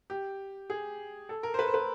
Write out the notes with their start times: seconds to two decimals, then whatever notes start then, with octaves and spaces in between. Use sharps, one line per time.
0.10 G4
0.70 G#4
1.29 A4
1.43 A#4
1.54 C5
1.59 B4
1.67 C5
1.74 B4